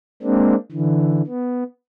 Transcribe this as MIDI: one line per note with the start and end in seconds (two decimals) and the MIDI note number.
0.23 0.55 56
0.23 0.55 58
0.23 0.55 60
0.23 0.55 62
0.72 1.22 50
0.72 1.22 52
1.27 1.63 59